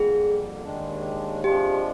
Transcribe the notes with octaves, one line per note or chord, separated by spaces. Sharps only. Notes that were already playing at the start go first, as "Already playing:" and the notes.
Already playing: F2 D3 G3 A#3 G#4
D#2 D#3 G#3 D4
C3 F3 G#3 D4 F4 G4